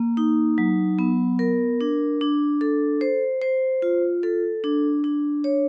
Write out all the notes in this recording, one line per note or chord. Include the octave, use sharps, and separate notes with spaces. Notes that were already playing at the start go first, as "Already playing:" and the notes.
Already playing: A#3
D#4
F#3
B3
A#4
D4
D4
A4
C5
C5
F4
A4
D4
D4
C#5